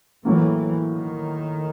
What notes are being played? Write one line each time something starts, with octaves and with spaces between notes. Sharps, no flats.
A2 E3 F#3 A#3
D#3